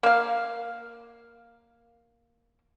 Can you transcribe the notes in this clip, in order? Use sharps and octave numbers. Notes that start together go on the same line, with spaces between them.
A#3 F5